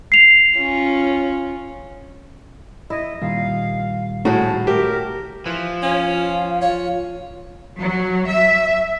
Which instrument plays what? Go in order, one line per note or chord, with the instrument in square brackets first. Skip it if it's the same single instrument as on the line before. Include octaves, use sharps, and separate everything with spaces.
[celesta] C7 F7
[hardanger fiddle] C#4 F4
[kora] E4 [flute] D#5
[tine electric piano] A#2 D#3 G3 [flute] F5
[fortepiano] A2 [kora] F#4 G#4 [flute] A5
[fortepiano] G4 [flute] A#4 [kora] E5
[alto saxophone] E3 [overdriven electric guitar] F3
[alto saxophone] C#4 [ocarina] F4 [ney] F5
[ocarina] F4 [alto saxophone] C#5
[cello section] F#3
E5